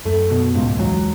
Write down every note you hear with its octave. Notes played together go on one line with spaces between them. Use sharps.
F#2 A3
B2
C#2 G#2
A2
E2 G#2 F#3